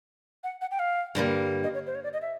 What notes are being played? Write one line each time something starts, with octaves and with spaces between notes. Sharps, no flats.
F#5
F#5
G5
F5
G2 D3 G3 A#3
D#5
C#5
C5
C#5
D5
D#5
E5